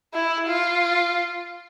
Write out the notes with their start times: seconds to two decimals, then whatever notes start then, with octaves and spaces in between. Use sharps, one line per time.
0.14 E4
0.48 F4